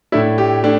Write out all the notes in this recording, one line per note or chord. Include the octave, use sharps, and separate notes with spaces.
A2 A3 D4 E4
G4
A3 D4